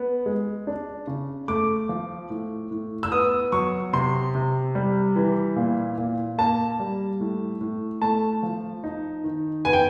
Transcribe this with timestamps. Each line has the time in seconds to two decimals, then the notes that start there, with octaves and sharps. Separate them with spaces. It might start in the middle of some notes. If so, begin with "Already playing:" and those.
Already playing: B3
0.26 G#3
0.67 D4
1.07 C#3
1.48 A3 D6
1.89 F3
2.30 A2
2.71 A2
3.03 E6
3.12 B3 D#6
3.52 F#3 C#6
3.93 C3 C6
4.35 C3
4.75 G3
5.16 E3
5.56 A#2
5.98 A#2
6.38 A#3 A5
6.80 G3
7.20 A2
7.61 A2
8.02 A3 A5
8.43 F3
8.84 D#4
9.24 D#3
9.65 B3 G#5
9.73 G5